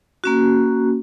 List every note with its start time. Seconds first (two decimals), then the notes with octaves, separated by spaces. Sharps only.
0.24 A#3 C#4 F#4